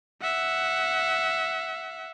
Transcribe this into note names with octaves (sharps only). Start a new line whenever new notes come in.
E5 F#5